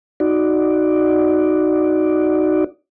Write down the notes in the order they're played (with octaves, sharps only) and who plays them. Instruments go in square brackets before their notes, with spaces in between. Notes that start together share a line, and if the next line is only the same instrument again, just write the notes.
[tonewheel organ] D#4 F#4 D5